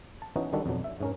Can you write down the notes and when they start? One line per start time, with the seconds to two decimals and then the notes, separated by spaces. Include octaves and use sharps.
0.22 A5
0.36 E3 B3 C#4 D#4 F#4
0.53 D#3 G3 G#3 D4 F#4 A4
0.66 F2 B2 F#3
0.84 E5
1.01 G#2 C#4 A#4